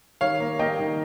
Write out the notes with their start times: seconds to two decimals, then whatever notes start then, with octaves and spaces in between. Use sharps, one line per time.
0.21 D#3 C#5 F5
0.40 A#3
0.59 A#3 D#5 G5
0.79 D#3